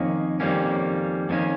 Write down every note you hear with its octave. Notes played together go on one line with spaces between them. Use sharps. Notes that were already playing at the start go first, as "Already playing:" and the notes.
Already playing: F2 D#3 A#3 C#4
F2 D#3 G3 A#3 C#4
F2 D#3 G3 A#3 C#4